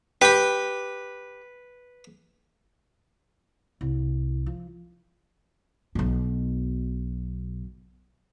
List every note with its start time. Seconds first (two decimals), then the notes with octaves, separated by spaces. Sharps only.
0.22 G4 B4 B5
3.81 C2
4.46 F3
5.95 B1 B2